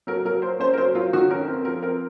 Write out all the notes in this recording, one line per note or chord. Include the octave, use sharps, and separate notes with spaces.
F#3 A#4
F#3 A#4
A#3 C5
C#4 C5
A#4
F#3 C5
F#3 F4
D#3 F#4
C#4 A#4
C4 A#4
F3 A#4
C4 A#4